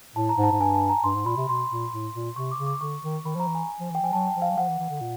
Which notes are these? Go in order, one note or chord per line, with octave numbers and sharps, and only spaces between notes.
A2 A5
A#5
G#2
A5
G#2
G2 G#5
A5
A#5
G2 C6
G#2
A#2 B5
C3
B2 C6
A#2
A2
A#2
C3 C#6
D6
C#3
D6
D3 C#6
D#3
D#3 B5
F3 A#5
E3
G#5
F3
E3
G5
F3 G#5
F#3 A5
G5
F3
F5
F#3
F3 F#5
E3
E3
D3
A#2